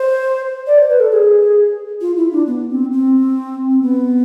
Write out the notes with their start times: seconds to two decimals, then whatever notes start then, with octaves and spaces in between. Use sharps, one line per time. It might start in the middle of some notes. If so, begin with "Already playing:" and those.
Already playing: C5
0.67 D5
0.78 C5
0.89 B4
1.00 A4
1.11 G#4
2.01 F4
2.16 E4
2.32 D4
2.47 B3
2.69 C4
2.92 C4
3.71 C4
3.82 B3